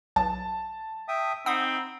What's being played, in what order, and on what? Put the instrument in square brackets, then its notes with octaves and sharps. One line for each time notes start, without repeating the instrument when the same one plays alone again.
[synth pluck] B1 [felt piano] A5
[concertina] E5 G5 D#6
[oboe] C4 [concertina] D#4 B5 [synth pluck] F#5 D#6